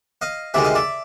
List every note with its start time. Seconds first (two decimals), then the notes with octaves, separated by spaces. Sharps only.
0.22 D#5 F5
0.54 D2 C3 D#3 G#3 D5 E5
0.64 D#5 F5
0.75 D5 E5